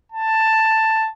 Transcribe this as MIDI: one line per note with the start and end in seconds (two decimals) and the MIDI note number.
0.12 1.08 81